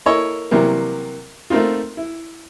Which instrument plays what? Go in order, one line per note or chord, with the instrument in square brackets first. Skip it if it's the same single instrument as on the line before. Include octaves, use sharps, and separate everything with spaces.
[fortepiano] A#3 E4 A4 C#5 D#5
C3 E3 F#3 G3 A#3
A3 A#3 C4 D#4 F4
E4